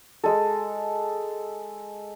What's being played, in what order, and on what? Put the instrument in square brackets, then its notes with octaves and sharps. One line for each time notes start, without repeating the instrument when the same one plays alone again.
[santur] G#3 A4